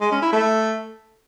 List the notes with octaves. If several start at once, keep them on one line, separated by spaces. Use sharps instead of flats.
G#3
C#4
E4
A3